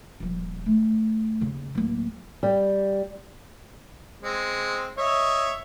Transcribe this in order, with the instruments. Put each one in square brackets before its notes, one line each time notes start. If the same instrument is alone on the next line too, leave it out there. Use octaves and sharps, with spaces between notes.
[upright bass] D#1 F3
A3
D#2 C#3
D1 A#3
[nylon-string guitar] G3
[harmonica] G#3 C4
C#5 D#5 E5